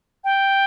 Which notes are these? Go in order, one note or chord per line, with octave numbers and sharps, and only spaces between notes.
G5